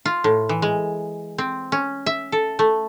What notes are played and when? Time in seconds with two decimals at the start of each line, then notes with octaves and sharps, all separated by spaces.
0.05 F4
0.24 A2
0.49 E3
0.62 G#3
1.38 C4
1.72 C#4
2.06 E5
2.32 A4
2.59 A3